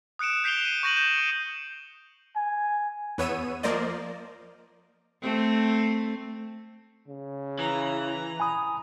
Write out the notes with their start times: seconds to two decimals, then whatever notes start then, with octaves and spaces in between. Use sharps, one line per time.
0.19 D#6 F#6 C#7 D7 E7
0.44 G6 B6 C7 D7 F7 G7
0.61 D#7 G7
0.83 C#6 G6 A#6 D#7 F#7
0.96 G6 E7
1.14 C#7
2.36 G#5
3.18 E2 B3 C#5 E6 D#7
3.63 F3 A#3 A#4 C5 D5 D#5
5.22 A3 C4
7.08 C#3
7.59 E3 A#5
8.40 G#5 B5 D#6